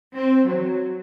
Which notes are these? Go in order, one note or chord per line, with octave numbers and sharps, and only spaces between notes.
C4
F#3